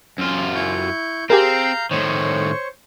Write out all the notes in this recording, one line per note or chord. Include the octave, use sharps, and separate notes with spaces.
F#2 F4
E4 C#6 G6
C4 G4 G#4 A#4 F5 A#5 G6
A2 D#3 C5 C#5 C#6